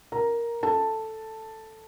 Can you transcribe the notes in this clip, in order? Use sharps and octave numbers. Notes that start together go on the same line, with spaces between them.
A#4 A#5
A4 A5